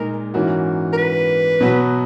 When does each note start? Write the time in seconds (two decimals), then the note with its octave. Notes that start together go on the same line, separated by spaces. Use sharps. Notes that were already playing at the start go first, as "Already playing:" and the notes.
Already playing: A#2 G#3 D#4 A#4
0.34 G#2 E3 A#3 C#4 F#4
0.93 A#4
0.97 B4
1.60 B2 F#3 B3 F#4